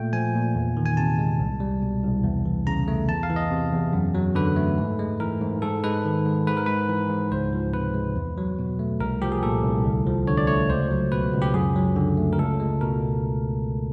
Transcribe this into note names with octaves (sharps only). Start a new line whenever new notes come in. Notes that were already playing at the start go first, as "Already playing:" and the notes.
Already playing: A#2 A3 G5
F3 G#5
A#2
E2
D#3
G#5
C3 A5
G#3
C2
G3
B2
C2
E2
E3
C#3 A#5
A3
E2 A5
F5
E3
D#5
C3
E2
F#2
F#3
D3 B4
A3
G#2
G#3
E3 A#4
G#2
G#2 A4
G#3 B4
D#3
G#2
G#2 B4
A#4
G#3 B4
E3
G#2
C#2 C5
F3
C3 B4
G#3
E2
F#3
B2
A3
C2 A#4
F3 G4
G#4
A#2 A4
C2
D2
F3
D3 C#5
D5
A3 C#5
C#2 C5
F#3
B2 B4
C#2
G4
F#2 G#4
F#3
D3
A3
A#4
C#2 A4
G#3
B2 A#4